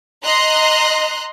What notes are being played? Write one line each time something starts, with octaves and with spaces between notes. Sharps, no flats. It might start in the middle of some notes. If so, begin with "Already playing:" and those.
D#5 A#5 C6 F#6